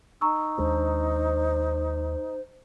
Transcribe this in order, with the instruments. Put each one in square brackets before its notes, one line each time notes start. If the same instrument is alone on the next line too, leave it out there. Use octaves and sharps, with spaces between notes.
[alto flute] D#4 [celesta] A#5 C#6 E6
[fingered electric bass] D#2 G#3 D4 [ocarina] C5